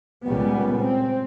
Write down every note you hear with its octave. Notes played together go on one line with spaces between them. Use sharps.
C#2 A#2 C#3 G3 B3
C4